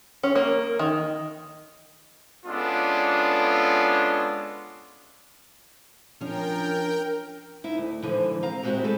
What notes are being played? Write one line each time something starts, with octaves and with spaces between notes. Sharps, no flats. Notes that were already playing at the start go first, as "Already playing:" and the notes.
C#4
A#3
D#3
G#3 B3 C#4 D4 F4 A4
F3 C#4 D4 A#4 G5
D#4 E4
D2
G#2 D3 E3 F3
C4 F5 A#5
G3 G#3 C4 E4 F#4 G4
G3 A3 F4 G#4 A4